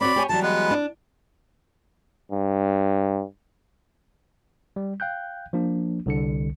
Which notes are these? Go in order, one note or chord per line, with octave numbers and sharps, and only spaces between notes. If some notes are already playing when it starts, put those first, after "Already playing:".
C4 F#4 C#5 D5 B5
G4 C#5 G#5
E3 F#3 G3 A5
G#3 B3 B4
D4
G2
G3
F5 G5 F#6 G6
F3 A#3 D4
C2 D3 C#7